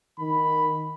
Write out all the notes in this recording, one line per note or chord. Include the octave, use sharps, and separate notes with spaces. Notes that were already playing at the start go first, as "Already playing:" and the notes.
D#3 B5